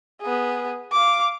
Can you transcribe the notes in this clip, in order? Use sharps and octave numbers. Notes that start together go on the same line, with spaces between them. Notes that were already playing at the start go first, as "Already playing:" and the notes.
B3 G#4
F5 D6